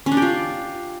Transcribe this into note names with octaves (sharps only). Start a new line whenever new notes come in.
C#4
D4
G4
F4